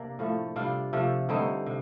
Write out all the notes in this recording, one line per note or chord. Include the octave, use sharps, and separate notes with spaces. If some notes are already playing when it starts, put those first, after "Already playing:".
Already playing: C3 A#3 D4
A2 F3 A3
C3 G3 D4 F4
C3 F3 A3
G2 D3 A3 C4 D#4
C3